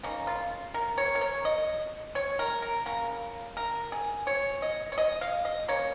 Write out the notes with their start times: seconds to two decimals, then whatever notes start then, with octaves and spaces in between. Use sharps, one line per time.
0.03 C#3 A#3 D#4
0.27 F4
0.74 A#4
0.98 C#5
1.15 A#4
1.21 C#5
1.45 D#5
2.15 C#5
2.39 A#4
2.62 A#4
2.86 C#3 A#3 A#4
3.57 A#4
3.92 G#4
4.27 C#5
4.62 D#5
4.92 C#5
4.98 D#5
5.21 F5
5.45 D#5
5.68 C#3 A#3 C#5